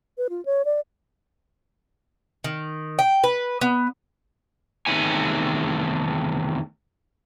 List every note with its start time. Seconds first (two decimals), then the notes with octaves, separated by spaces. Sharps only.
0.18 B4
0.30 F4
0.45 C#5
0.65 D5
2.44 D#3
2.99 G5
3.24 B4
3.61 B3
4.86 E2 C3 D#3 A3 C#5 G#5